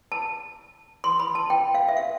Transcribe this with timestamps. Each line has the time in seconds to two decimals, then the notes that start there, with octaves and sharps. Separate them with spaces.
0.12 A5
1.04 C6
1.19 B5
1.35 A5
1.50 G5
1.75 F5
1.88 E5
1.97 F5